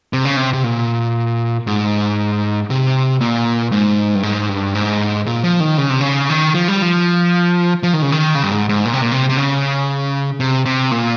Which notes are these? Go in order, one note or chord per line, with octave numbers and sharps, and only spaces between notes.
C3
C#3
C3
C3
A#2
G#2
C3
A#2
G#2
G2
G#2
G2
G#2
A#2
F3
D#3
C#3
C3
C#3
D#3
F3
G3
F3
F3
D#3
C#3
D#3
C#3
G2
G#2
G#2
A#2
C3
A#2
C3
C3
C#3
C3
C3
A#2